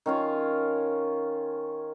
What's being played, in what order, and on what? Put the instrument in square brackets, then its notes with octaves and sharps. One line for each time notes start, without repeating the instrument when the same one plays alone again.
[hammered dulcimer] D#3 C#4 F4